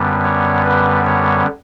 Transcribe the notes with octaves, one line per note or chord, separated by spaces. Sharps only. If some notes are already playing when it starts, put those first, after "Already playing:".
Already playing: F#2 D3 G3 B3
C#5
B4
C#5